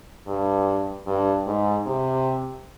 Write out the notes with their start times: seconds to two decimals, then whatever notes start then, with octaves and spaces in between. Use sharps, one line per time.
0.27 G2
1.07 G2
1.47 G#2
1.86 C3